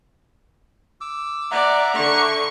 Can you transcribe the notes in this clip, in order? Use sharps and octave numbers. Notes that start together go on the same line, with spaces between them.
D6 E6
D5 E5 F#5 A#5
D3 C#6